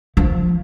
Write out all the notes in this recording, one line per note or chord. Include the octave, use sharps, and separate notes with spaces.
F3